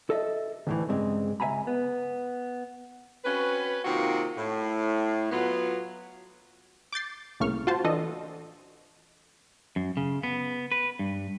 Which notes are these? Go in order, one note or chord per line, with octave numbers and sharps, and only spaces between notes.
A4 D#5 E5
D2 A2 E3
G2 C#3 G#3 C4
C#2 E5 F5 G#5 A#5 B5
B3
C4 C#4 F#4 B4
C3 D#3 A#3 C4 F4 F#4
A2
F#3 B3 F4
D6 G6 A6 C7
C2 A2 C#3 A#3 C#6 F6
F4 F#4 C5 A5
E3 D4 A4 D#5
F#2
C#3
B3
B4
G2